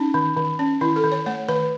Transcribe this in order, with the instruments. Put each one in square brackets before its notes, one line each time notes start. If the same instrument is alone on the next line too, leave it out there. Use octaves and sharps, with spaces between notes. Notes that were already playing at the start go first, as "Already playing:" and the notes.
Already playing: [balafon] C#4 D#4
D#3
D#3
C#4
D#3 E4
A4
D#3
C#5
A3 C#5
D#3 B4